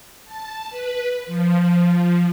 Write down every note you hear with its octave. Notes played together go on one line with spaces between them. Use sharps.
A5
B4
F3